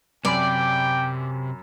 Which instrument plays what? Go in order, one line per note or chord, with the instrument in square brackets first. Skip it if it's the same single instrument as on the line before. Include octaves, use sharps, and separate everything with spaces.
[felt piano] F#2 G#5 B5 [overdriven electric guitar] C3 [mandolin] D5 [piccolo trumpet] G5